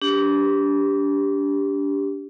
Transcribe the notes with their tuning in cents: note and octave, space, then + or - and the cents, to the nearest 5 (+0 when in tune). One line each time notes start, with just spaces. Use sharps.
D4 -30 G4 +0